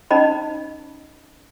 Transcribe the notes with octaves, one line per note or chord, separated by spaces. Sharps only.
C#4 D#4 D#5 B5